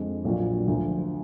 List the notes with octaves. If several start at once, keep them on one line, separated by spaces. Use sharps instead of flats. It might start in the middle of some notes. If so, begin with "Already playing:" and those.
Already playing: F2 D3 G#3
A#1 A#2 F#3 D4 F4
D2 D3 F3